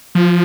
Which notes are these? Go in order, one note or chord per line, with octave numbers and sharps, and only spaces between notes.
F3